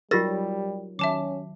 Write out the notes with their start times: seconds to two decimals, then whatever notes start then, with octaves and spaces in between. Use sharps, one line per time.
0.11 F#3 G3 D#4 F4 G4 A#4 A6 A#6
0.99 D#3 F#3 C#4 E5 A5 D6